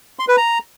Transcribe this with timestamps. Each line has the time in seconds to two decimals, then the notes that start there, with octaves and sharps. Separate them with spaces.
0.19 C6
0.28 B4
0.37 A#5